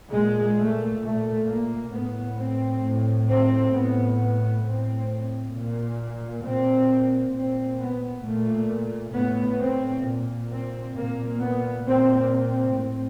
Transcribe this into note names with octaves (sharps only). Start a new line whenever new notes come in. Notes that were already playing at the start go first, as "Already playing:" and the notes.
A#2 G#3
A3
A#2 A3
A#3
A2 B3
C4
A2
C4
A2 B3
B3
A2 C4
A#2
A#2 C4
A#2 C4
B3
A#2 A3
A2 B3
C4
A#2
C4
A#2 A#3
B3
A#2 C4
C4
A2